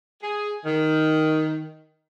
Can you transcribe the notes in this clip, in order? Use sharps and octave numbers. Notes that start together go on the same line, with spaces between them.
G#4
D#3